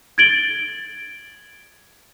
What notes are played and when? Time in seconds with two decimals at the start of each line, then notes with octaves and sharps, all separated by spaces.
0.18 G#6 A6 D7 F#7 G7